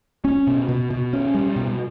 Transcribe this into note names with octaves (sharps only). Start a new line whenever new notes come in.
C#4
B2
B2
B2
C#4
G3
B2